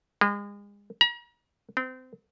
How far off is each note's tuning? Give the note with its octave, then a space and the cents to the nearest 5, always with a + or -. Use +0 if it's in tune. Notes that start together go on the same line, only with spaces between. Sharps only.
G#3 -35
A#5 +40
C4 -30